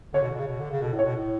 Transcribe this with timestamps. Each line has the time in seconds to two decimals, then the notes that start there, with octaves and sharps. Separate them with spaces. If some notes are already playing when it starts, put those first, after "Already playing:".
0.13 D3 C#5
0.22 B2
0.31 D3
0.35 B2
0.39 C#3
0.48 B2
0.59 D3
0.71 C#3
0.82 B2 A4
0.93 A2
0.99 C#5
1.05 B2
1.16 A2